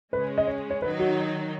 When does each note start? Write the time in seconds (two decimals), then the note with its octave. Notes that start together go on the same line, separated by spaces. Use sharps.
0.13 C#3 G#3 C#4 B4
0.38 D#5
0.47 C#5
0.70 C#5
0.81 D#3 F#3 D#4 B4
1.00 F#4